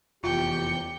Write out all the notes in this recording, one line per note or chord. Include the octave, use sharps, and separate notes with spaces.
F1 E2 F4 G4 G5 C#7